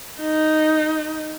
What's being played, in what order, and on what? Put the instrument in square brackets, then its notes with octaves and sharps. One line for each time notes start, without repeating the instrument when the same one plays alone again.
[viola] D#4